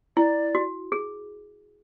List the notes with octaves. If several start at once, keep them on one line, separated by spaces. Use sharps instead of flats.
E4 D5
F#4
G#4